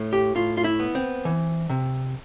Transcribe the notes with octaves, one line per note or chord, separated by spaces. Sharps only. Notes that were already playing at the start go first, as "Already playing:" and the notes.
Already playing: A2
G4
A2 F4
F4
E4
B3
C4
E3
C3